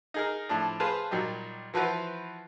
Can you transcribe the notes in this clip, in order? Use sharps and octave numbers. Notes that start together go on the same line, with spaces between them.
D#4 G#4 A#4
A2 F3 D4
G#4 B4 C5 F5 A5
A#2 F#3 G3 D#4 G4
E3 F3 F#4 B4 C5